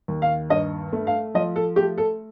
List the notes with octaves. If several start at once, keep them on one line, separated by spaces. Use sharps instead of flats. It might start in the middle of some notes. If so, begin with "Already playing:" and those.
D#2
F5
G2 D#5
A3
F5
F3 D#5
A4
A3 G4
A4